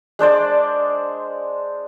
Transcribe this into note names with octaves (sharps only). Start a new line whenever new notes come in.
G#3 D4 C5 D5